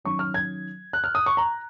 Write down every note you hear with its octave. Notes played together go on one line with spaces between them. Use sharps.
D#3 F#3 C#4 C#6
F6
G#6
F#6
F6
D#6
C#6
A#5